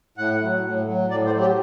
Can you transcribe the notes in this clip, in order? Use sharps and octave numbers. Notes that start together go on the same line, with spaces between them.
A2 F#5
F#3
A2
F#3
A2 D5
C5
F#3
G4